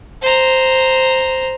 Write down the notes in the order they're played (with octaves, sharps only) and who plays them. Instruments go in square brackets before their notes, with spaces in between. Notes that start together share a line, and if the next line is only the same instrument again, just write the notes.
[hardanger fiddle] C5 A#5